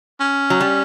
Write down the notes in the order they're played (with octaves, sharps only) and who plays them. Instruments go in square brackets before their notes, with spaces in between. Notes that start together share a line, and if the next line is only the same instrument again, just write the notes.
[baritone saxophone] C#4
[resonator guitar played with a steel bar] F#3
G3